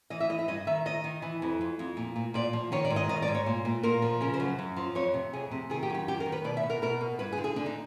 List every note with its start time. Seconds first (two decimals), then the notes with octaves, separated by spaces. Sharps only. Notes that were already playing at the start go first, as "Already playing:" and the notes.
0.10 E3 D#5
0.20 E5
0.30 E3 D#5
0.39 E5
0.48 G2 D#5
0.67 D#3 E5
0.85 D#3 D#5
1.04 D#3
1.22 E3
1.42 F2
1.61 F2
1.79 F2
1.97 A#2
2.16 A#2
2.34 A#2 D5
2.53 F3
2.72 D#3 C#5
2.85 D5
2.90 G#2
2.96 D#5
3.09 D#3 D#5
3.22 D5
3.28 G#2
3.35 C#5
3.46 A#2
3.65 A#2
3.83 A#2 A#4
4.02 F3
4.21 C#3 A#4
4.34 C5
4.40 F#2
4.59 F#2
4.76 F3
4.95 F2 C#5
5.14 C3
5.33 F2 G#4
5.51 C3
5.70 D#3 G#4
5.83 G4
5.90 F#2
5.95 G4
6.08 D#3 G4
6.20 A#4
6.26 D#3
6.32 B4
6.44 B2 D5
6.57 E5
6.63 B2
6.70 A#4
6.82 B2 A#4
7.01 B2
7.19 G2 B4
7.32 G#4
7.37 D3
7.44 G#4
7.56 D3 D4
7.66 D#4